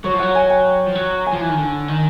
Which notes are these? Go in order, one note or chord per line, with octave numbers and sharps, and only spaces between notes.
F#3 C#5
F3
F#3 F#5
G#5
G5
F3
F#3
G#5
F3
E3
D#3
D3
D#3